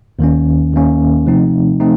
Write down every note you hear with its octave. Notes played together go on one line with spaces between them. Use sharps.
D#2 D#3 A#3 C#4
D#2 D#3 A#3 C#4
C3 F3 A3 C4 D#4
A3 C4 D#4